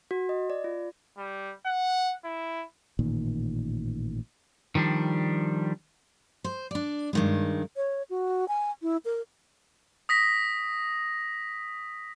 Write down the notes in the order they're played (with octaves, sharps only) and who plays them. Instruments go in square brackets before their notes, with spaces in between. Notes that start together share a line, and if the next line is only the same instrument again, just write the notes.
[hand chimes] F#4
D#5
D5
F4
[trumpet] G3
F#5
E4
[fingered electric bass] A1 A#2 D#3
[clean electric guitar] D#3 F3 G3 D4
[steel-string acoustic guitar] C5
D4 D5
G2 D#3 G#3
[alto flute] C#5
F#4
G#5
E4
A#4
[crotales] D#6 A#6 B6